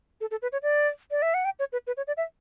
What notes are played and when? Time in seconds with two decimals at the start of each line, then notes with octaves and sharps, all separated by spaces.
0.21 A4
0.31 A4
0.42 B4
0.52 C#5
0.63 D5
1.11 D5
1.22 E5
1.34 F#5
1.45 G5
1.59 C#5
1.72 B4
1.87 B4
1.97 C#5
2.07 D5
2.17 E5